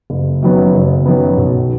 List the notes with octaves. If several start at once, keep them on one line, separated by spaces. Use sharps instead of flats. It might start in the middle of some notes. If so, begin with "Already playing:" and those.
F#1
F#2 D#3 F#3 B3
F#1
F#2 D#3 F#3 B3
B1